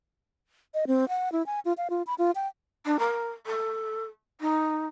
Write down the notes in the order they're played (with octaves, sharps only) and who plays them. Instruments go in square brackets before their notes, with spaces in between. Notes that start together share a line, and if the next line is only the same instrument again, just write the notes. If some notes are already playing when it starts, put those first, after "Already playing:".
[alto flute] D#5
C4
F#5
E4
G#5
F4
F5
F4
B5
F4
G5
[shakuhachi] D4
A#4
A4
D#4